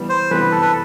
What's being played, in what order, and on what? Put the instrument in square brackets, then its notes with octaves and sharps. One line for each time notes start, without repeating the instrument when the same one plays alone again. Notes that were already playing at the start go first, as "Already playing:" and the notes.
Already playing: [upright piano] E3 G3 B3
[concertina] C5
[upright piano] E3 G3 B3 [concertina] B4
[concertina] A4
B4